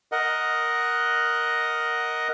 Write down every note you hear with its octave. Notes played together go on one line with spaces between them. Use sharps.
A#4 D#5 F#5